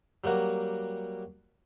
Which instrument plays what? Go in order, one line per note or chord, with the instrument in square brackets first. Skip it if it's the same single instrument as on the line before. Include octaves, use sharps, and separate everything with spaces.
[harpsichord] F#3 G3 A#3 F#4